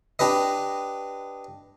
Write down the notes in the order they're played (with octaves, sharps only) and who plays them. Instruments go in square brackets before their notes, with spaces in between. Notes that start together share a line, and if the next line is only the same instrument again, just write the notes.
[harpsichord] D4 G4 B4 D#5